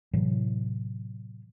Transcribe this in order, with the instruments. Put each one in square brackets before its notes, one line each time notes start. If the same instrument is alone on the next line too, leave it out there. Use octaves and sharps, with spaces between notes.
[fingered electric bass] A2 C3 E3 F#3